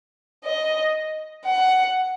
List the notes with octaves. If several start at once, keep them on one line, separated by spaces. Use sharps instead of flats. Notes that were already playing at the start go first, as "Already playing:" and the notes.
D#5
F#5